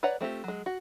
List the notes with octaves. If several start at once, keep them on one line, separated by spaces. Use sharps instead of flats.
B4 C#5 D5 F#5 A#5
A3 C4 F4 G4
F#3 G#3
F#4